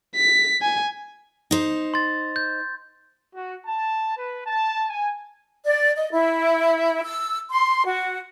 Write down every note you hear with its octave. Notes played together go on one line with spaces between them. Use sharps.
B6
G#5
D#4 C5
C6 A6
G6
F#4
A5
B4
A5
G#5
D5
D#5
E4
E6
C6
F#4